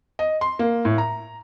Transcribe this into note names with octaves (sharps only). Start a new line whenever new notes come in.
D#5
C6
A#3
A2
A#5